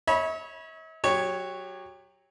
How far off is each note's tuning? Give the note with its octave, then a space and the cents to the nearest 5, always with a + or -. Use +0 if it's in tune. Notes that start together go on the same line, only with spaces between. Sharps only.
C#5 -10 E5 -45 B5 -20
F#3 +0 G4 +25 C#5 +0